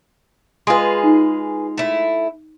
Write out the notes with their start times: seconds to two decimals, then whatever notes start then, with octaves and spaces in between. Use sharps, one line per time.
0.67 G#3 F4 G#4 B4 C6
1.03 D#4
1.77 A3 E4